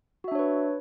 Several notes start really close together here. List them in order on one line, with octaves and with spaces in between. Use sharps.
F#4 E5 D4 C#5 B4